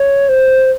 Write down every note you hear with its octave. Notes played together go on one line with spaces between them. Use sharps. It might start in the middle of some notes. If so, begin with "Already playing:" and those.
Already playing: C#5
C5